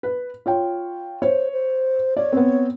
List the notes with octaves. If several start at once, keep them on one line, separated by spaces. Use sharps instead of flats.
B4
F4 C#5 G5
C5 C#5
C5
C#5 D5
B3 C4